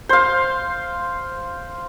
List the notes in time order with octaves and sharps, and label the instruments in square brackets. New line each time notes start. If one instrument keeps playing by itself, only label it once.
[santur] C5 F5